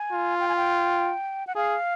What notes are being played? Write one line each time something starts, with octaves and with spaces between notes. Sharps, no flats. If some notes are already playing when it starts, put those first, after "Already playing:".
Already playing: G#5
F4
G5
G#5
G5
F#5
G#4 F5